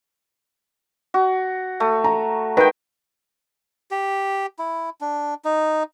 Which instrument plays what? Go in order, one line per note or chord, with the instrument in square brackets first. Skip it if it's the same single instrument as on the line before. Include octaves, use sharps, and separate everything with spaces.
[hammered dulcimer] F#4
A3
[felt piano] A#5
[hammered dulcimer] D#3 G5 [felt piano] B4
[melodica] G4
E4
D4
D#4